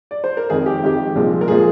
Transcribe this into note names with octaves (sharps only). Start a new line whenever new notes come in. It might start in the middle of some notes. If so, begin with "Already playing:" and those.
D5
C5
A#4
F2 D#3 G#3 G#4
G4
F2 D#3 G#3 G4
C2 A#2 F3 G#3
A#4
A#2 F3 G#3 G#4